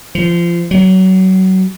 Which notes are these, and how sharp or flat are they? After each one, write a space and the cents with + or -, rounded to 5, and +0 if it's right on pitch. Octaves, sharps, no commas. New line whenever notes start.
F3 -25
F#3 +25